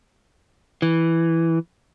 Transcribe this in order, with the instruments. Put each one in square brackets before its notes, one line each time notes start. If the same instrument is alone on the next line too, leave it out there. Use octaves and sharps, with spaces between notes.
[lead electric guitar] E3